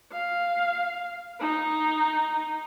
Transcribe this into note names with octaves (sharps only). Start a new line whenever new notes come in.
F5
D#4